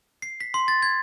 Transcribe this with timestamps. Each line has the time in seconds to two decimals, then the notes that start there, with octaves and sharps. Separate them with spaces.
0.22 C7
0.41 B6
0.54 C6
0.68 A6
0.83 G#6